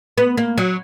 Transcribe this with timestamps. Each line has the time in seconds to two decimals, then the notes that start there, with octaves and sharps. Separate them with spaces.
0.18 B3
0.37 A#3
0.58 F#3